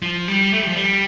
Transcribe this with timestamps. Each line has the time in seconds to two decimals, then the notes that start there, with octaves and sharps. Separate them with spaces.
0.02 F3
0.28 G3
0.53 A3
0.61 G3
0.68 F3
0.75 G3